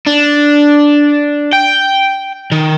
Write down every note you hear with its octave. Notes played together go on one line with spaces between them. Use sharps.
D4
G5
D#3